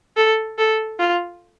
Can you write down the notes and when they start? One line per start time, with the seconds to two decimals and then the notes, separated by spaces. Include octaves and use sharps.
0.17 A4
0.58 A4
0.99 F4